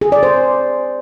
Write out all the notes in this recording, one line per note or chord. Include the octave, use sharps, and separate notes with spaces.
G#4
D5
C5